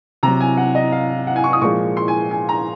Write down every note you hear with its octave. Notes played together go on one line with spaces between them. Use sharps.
C3 F#3 A#5
G#5
F#5
D#5
F5
F#5
G#5
C#6
D#6
A#2 F3 G#3 C#6
C6
G#5
G#5
A#5